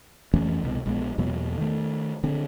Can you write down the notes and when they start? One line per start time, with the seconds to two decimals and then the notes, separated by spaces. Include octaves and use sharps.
0.33 F2 E3 A3 C#4
0.64 C2 B2
0.86 A#1 G#3 B3
1.18 E2 B2 F#3 A#3
1.57 D#3 A3
2.23 D3 C4 D4